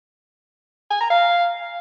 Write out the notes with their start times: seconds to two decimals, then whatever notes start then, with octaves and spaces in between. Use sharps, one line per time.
0.91 G#5
1.00 A#5
1.10 F5